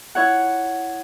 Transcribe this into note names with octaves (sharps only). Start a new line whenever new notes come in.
E4 C#5 F#5